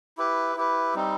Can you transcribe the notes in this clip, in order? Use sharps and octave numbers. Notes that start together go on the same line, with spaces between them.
E4 G4 B4
E4 G4 B4
G3 C4 D#4